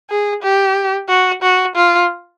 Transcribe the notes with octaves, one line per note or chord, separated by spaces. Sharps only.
G#4
G4
F#4
F#4
F4